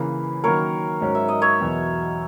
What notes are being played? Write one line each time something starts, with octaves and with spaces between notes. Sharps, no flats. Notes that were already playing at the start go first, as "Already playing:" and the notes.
Already playing: C#3 E3 A#3 B4
D#3 F#3 A#3 C#4 A#4 C#5
G#2 F#3 C#4
E5
D#5
C#5 E5
E2 B2 F#3 B3